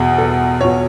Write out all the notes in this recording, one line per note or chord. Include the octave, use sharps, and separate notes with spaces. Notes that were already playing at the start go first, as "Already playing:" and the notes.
Already playing: E2 B2 G#4
A4
E2 B2 C#5